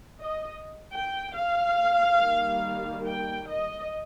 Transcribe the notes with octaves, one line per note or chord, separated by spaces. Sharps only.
D#5
G5
F5
D#3 G3 A#3
G5
D#5